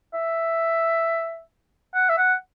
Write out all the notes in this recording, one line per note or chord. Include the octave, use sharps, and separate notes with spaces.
E5
F#5
E5
F#5